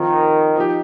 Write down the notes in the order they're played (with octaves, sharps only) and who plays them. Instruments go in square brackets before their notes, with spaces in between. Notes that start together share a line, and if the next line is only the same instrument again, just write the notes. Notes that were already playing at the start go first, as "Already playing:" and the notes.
Already playing: [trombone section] D#3 [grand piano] F3 C4 F4
[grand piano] F3 D#4 G4